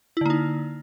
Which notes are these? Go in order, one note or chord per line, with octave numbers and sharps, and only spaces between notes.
D3 A#3 D#4 E4